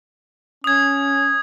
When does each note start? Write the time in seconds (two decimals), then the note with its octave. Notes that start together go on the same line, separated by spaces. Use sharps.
0.64 C#4 D#6 G#6